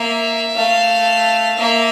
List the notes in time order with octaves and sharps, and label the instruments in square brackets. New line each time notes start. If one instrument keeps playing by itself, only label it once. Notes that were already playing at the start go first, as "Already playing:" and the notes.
Already playing: [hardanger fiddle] A#3 [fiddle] E5
[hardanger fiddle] A3 [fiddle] F5
[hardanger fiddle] A#3 [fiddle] E5